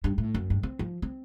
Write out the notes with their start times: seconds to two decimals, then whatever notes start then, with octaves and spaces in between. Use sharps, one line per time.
0.04 G2
0.18 A2
0.34 F#2
0.50 G2
0.63 C4
0.79 F3
1.02 C4